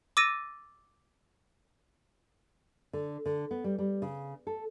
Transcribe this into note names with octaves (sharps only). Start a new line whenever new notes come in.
D6 E6 A6 A#6 D#7
D3
D3
B3
G3
G3
C#3
A4